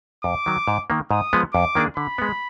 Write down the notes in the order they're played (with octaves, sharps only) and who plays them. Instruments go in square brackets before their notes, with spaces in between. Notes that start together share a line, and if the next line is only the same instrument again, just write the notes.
[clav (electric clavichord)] F2 [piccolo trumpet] D6
[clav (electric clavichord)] D#3 F#3
G#2
D#3 A#3
[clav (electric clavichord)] G#2 [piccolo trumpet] D#6
[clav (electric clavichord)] F3 G#3 B3
[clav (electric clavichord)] F2 [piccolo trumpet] D6
[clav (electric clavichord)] D#3 A#3 D4 G#4
[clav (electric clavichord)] D3 [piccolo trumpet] B5
[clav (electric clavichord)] G#3 B3